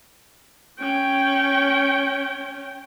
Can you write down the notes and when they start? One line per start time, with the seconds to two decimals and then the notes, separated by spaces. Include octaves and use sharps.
0.79 C#4 G5